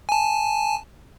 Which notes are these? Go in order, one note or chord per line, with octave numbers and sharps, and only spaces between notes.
G#5 A5